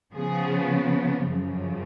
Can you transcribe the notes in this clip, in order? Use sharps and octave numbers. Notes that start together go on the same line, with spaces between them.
C#3 F3 B3 G#4
F#2 C#3 F3